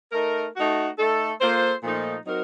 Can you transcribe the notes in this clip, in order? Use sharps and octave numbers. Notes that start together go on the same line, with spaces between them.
A3 D#4 A#4
A3 D#4 F#4
A3 D#4 A4
A#3 F4 A4 C5
A#2 F3 A3 D#4
F#3 C4 D#4 F#4 A#4